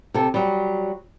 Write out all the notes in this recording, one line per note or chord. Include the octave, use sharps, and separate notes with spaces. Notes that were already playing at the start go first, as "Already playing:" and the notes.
C3 A4
F#3 G3